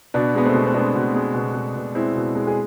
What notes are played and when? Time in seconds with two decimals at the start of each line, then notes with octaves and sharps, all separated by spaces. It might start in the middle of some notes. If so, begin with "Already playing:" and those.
0.14 B2 B3 D4
0.35 G#3 B3
0.45 A3 C4
0.54 B2
0.66 C4
0.74 G#3 B3 D4
0.95 B2
1.15 G#3
1.34 B2
1.55 G#3
1.75 B2
1.95 G#3 C4 E4
2.15 B2
2.35 G#3
2.47 G#4